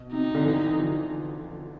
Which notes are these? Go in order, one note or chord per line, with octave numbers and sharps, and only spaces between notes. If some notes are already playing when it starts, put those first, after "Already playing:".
Already playing: B2
C3 D#4
C3
D3
E3
F3